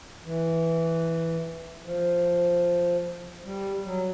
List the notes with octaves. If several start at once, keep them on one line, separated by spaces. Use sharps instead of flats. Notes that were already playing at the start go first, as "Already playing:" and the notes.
E3
F3
G3
F#3